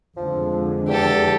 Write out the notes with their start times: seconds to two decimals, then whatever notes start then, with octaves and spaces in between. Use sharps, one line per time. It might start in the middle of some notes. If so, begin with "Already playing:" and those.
0.17 F2 D3 F3 G#3
0.88 E2 G4 A4